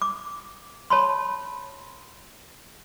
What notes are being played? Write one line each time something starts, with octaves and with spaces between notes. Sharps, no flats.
D6
C#5 A5 B5 C6